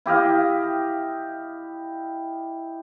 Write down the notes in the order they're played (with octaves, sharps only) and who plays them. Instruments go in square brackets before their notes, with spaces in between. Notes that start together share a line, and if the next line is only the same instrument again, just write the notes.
[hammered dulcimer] E4 G4 D#5 F5